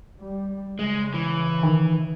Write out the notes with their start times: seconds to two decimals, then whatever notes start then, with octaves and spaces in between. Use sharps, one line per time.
0.20 G3
0.79 C#3 G#3
1.14 E3
1.63 D#3